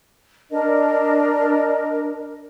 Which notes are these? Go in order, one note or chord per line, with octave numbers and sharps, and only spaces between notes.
D4 A#4 D#5